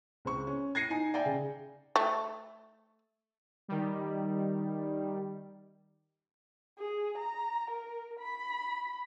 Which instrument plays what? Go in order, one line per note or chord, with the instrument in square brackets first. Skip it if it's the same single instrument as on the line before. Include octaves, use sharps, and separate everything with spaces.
[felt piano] C#2 C4 C#6
C#4
G#6 A#6 C7 C#7 D#7
D#4 G#5
D5 E5 G5 G#5
C#3
[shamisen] A3
[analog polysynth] D#3 G3
[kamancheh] G#4
A#5
A#4
B5